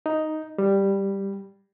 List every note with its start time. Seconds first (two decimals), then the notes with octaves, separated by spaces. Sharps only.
0.06 D#4
0.58 G3